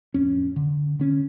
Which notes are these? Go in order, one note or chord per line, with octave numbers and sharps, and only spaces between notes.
D1 F2 C#4
D3
D3 C#4